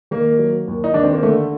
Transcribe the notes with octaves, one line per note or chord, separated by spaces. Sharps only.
D#3 A#3
F#3
D#2
D#4
D#3 D4
C4
A#3
D3 A3